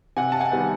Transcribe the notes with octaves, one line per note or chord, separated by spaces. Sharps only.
C3 F#5 G#5
A5
F#5 G#5
D#3 G3 B3